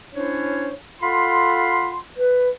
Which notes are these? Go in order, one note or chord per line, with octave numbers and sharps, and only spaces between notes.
C#4 D4 E4 C5 C#5
F4 A4 F5 F#5 B5 C6
B4